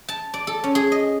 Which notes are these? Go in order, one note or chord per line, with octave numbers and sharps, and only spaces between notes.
A5
D5
A4
C#4
G#4
D#5